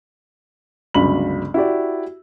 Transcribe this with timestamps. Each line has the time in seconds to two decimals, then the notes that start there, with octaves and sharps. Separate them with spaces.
0.95 G1 C#2 F#3 B5 F#7
1.54 E4 F#4 G4 D5